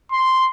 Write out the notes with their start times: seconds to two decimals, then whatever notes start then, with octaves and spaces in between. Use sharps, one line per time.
0.12 C6